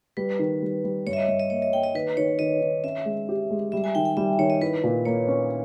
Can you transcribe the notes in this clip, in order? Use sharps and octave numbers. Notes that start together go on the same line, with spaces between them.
G3 B4
D#3
G3
G3
G2 C#5
E5
D#5
G2 E5
D#5
A#3 C#5
D#5
A#3 G5
D#5
D#3 B4
D#3 C#5
D#3 D#5
D#3
C#4 E5
G#3
G4
G#3
G3 E5
G#5
D#3 G5
G5
G3 E5
D#3 C#5
D#5
E4 B4
A#2
A#3 C#5
C#4